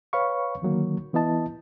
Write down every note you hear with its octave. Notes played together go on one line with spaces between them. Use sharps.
B4 C#5 F5 B5 C#6
D3 D#3 F#3 A#3
E3 B3 E4 D#5 A5